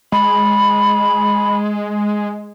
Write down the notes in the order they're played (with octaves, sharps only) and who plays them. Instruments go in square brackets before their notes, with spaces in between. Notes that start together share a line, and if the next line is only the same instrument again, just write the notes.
[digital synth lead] G#3 [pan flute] B5